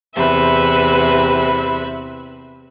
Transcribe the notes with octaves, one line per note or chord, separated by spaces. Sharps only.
E2 C3 B4 E5